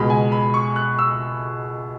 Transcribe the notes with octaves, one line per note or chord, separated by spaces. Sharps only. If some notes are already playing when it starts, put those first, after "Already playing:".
Already playing: C#2 B2 G#3 B5
G#5
B5
C#6
F#6
E6